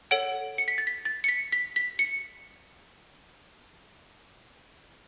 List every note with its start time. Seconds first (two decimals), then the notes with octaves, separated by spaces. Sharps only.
0.11 A4 C#5 F#5 D7
0.58 C#7
0.68 B6
0.78 A6
0.87 B6
1.05 A6
1.24 C#7
1.28 B6
1.52 B6
1.76 B6
1.99 C#7